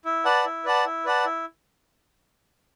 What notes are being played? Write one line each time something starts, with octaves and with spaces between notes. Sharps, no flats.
E4
B4 D5 F#5 A5
E4
B4 D5 F#5 A5
E4
B4 D5 F#5 A5
E4